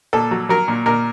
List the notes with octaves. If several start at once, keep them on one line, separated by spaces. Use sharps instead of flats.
A#2 A4
F#3
F#3 A#4
A#2
A#2 A#4